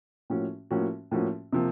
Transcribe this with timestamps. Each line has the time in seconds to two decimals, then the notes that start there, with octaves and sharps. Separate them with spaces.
0.30 A2 F3 A#3 C#4 F#4
0.71 A2 F3 A#3 C#4 F#4
1.11 A2 F3 A#3 C#4 F#4
1.53 C3 F3 A#3